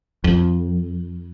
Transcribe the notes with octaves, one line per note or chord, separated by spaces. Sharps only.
F2